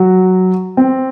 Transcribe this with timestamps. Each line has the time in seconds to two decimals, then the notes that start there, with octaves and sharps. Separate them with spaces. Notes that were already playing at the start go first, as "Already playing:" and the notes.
Already playing: F#3 F#4
0.77 C4